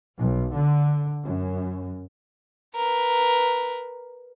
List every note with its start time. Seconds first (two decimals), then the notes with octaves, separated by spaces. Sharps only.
0.16 B1
0.52 D3
1.25 F#2
2.76 A#4 B4